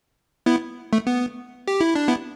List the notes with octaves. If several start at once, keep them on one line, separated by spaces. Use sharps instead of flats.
B3 E4
A3
B3
G4
E4
D4
B3 E4